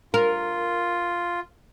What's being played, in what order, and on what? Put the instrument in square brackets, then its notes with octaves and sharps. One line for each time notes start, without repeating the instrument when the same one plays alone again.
[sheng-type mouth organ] F4 [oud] A#4